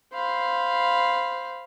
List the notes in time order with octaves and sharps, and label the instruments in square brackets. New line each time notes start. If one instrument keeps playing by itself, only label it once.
[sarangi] C5 [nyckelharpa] F5 B5